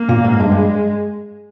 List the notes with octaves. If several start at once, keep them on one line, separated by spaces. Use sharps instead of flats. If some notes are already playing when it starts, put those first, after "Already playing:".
Already playing: A#3
A#2
G#2
G2 G#3
G2